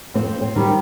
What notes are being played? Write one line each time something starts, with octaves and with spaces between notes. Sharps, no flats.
F2 C4
C4
D#3 G3